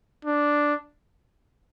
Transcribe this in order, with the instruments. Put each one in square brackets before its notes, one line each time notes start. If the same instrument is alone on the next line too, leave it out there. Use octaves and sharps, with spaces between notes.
[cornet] D4